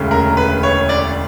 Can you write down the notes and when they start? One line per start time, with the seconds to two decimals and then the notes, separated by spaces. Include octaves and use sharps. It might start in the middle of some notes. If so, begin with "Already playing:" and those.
Already playing: E1 D2 C#3
0.11 A#4
0.37 B4
0.63 C#5
0.89 D5